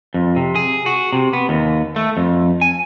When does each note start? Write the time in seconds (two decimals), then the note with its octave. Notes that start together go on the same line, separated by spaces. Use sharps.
0.14 F2
0.36 C3
0.56 G#4
0.86 F#4
1.13 C3
1.33 B3
1.49 D#2
1.96 A3
2.17 F2
2.62 G#5